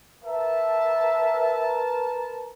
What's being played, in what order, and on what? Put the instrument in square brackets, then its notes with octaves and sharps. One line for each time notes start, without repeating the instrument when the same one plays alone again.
[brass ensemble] A#4 B4 A5 [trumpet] E5